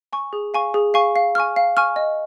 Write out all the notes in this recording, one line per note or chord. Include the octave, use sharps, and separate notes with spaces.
G#5 C#6
G#4
F5 G#5 C#6
G#4
F5 G#5 C#6
F5
G#5 C#6 F6
F5
G#5 C#6 F6
D#5